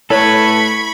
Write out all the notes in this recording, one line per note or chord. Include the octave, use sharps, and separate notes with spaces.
A2 A4 B4 C#5 B5 C#6